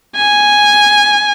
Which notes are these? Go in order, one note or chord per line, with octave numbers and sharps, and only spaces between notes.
G#5